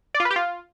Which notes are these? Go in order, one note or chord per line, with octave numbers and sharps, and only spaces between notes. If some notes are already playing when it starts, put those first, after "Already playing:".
D5
F4
B4
G4
F4